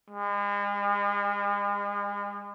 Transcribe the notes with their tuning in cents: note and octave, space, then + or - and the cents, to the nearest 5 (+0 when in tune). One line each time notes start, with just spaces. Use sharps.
G#3 -40